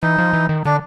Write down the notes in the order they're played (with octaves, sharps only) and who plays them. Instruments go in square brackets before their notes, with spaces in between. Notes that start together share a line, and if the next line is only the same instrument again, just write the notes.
[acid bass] E3 [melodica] D#4
[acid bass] F3
E3
D#3
[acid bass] D3 [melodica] D4